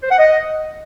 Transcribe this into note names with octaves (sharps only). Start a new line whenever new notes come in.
C5
F#5
D#5